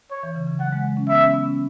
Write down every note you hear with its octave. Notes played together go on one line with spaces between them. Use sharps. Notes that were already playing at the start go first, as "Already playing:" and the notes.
C#5
E3
C#3
C#3
F#3 F#5
G#3
G#3
C#4
B3 E5
C#4
B3
C#4